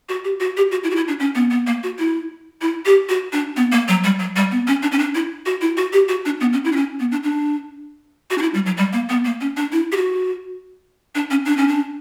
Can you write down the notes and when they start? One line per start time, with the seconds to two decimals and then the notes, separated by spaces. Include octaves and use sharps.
0.09 F#4
0.24 G4
0.40 F#4
0.57 G4
0.72 F#4
0.84 E4
0.91 F#4
0.96 E4
1.08 D4
1.20 C#4
1.35 B3
1.51 B3
1.67 A#3
1.83 F#4
1.99 E4
2.61 E4
2.86 G4
3.09 F#4
3.33 D4
3.57 B3
3.72 A#3
3.88 F#3
4.04 G3
4.19 F#3
4.36 G3
4.51 B3
4.67 C#4
4.83 D4
4.92 C#4
4.99 D4
5.15 E4
5.46 F#4
5.61 E4
5.77 F#4
5.93 G4
6.09 F#4
6.26 D4
6.41 B3
6.53 C#4
6.65 E4
6.72 D4
6.76 C#4
7.00 B3
7.12 D4
7.23 D4
8.30 F#4
8.38 D4
8.42 E4
8.54 G3
8.66 F#3
8.77 G3
8.93 A#3
9.09 B3
9.25 A#3
9.41 C#4
9.57 D4
9.72 E4
9.92 G4
9.96 F#4
11.15 D4
11.31 C#4
11.46 D4
11.57 C#4
11.68 D4